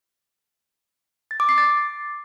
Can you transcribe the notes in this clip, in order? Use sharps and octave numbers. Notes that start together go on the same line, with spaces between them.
A6
D6
C7
A6